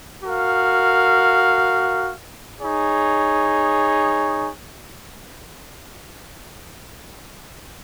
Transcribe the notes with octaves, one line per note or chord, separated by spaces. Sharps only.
F#4 A#4 F5
D#4 G#4 C#5